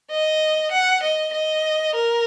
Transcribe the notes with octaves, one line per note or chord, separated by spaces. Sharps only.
D#5
F#5
D#5
D#5
A#4